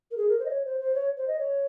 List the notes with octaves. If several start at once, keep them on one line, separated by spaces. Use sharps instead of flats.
A#4
G#4
A#4
C5
D#5
C#5
C5
C5
C#5
C5
D#5
C#5